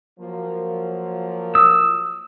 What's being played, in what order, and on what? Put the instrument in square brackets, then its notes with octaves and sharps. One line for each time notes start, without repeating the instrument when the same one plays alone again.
[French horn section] F3 F#3 A#3
[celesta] D#6 [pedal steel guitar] E6